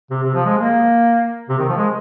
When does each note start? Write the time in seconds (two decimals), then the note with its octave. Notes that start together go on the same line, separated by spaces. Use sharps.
0.10 C3
0.23 C3
0.34 F3
0.46 G#3
0.58 A#3
1.49 C3
1.58 D#3
1.68 F3
1.77 G#3